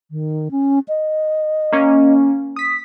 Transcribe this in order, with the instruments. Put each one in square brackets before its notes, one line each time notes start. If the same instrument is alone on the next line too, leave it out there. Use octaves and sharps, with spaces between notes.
[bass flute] D#3
C#4
D#5
[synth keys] A#3 C#4
D#6 B6